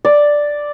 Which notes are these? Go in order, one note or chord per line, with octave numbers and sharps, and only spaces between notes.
D5